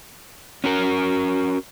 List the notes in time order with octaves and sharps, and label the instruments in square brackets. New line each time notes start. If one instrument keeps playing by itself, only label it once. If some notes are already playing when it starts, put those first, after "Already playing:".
[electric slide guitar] C#4 F#4 A#4